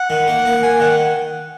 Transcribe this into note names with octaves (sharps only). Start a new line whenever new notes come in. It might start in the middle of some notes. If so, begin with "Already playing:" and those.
Already playing: F#5
D#3
A#3
A#3
A#3 G#5
D#3 F#5